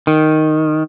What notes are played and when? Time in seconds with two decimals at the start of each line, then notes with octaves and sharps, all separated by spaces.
0.07 D#3